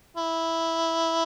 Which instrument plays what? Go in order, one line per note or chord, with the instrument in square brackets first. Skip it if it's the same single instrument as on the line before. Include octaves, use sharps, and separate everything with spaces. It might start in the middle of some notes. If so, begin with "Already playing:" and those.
[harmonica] E4